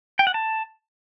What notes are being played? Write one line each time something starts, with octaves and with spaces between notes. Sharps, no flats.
G5
F#5
A5